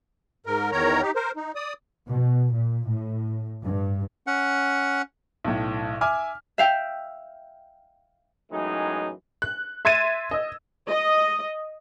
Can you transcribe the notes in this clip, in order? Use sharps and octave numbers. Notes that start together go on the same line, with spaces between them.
G#2 A#4
E2 D#3 A#4 C#5 A#5
D#4 G4
A#4 C5
D#4
D5 D#6
B2
A#2
A2
G2
C#4 F#5
B1 A2
E5 G#5 D6 F6
E5 F5 G5
F#2 A2 E3 F#3 G#3 D#4
F#6
E5 C6 G#6 A6 D#7 E7
D#5 E6
D#5